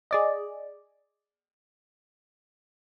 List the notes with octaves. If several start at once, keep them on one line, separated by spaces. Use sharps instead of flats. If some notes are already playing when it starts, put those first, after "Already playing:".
G#4 D5 D#5